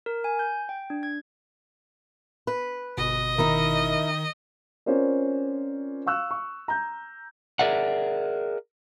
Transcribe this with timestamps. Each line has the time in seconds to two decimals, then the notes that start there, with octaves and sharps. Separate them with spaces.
0.06 A#4
0.24 G#5
0.39 G6
0.69 G5
0.90 D4
1.03 G#6
2.47 B4
2.98 G1 B2 D#5
3.38 D#3 D#4 E4 A#4
4.86 C4 C#4 F4 A#4 C5 D5
6.06 F5 C#6 E6 F#6
6.31 C#6
6.68 A#5 G6
7.59 G#4 A#4 D5 E5 F#5